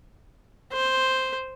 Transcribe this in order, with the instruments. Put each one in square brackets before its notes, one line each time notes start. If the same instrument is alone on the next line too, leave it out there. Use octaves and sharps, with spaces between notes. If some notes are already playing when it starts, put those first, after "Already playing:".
[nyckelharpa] C5